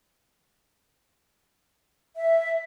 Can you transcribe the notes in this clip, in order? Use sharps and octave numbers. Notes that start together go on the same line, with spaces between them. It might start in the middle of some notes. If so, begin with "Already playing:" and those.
E5